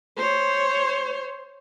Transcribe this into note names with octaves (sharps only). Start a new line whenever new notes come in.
C5 C#5